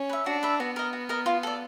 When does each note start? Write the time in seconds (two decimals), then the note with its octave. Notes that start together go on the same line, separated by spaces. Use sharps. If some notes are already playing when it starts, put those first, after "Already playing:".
Already playing: C#4
0.09 B4 E5
0.26 D4 F#4
0.43 B4 E5
0.60 B3 F#4
0.76 A#4 D#5
0.93 F#4
1.09 A#4 D#5
1.26 F4
1.43 A4 D5